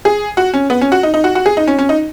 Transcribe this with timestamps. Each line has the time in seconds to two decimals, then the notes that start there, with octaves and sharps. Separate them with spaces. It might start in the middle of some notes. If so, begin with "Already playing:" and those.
0.05 G#4
0.37 F#4
0.54 C#4
0.70 B3
0.81 C#4
0.92 F#4
1.03 D#4
1.14 D#4
1.24 F#4
1.35 F#4
1.46 G#4
1.57 D#4
1.67 C#4
1.79 C#4
1.89 D#4